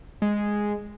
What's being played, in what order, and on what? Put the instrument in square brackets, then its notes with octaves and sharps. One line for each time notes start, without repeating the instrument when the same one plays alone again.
[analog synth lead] G#3